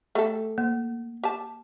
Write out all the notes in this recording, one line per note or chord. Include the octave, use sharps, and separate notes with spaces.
A3 G4 A4
A#3
G4 A5